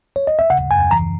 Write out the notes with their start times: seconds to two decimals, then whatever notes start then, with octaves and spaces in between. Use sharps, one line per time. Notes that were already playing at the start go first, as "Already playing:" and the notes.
0.16 C#5
0.27 D#5
0.39 E5
0.50 C#3 F#5
0.71 F#2 G#5
0.91 E3 A#5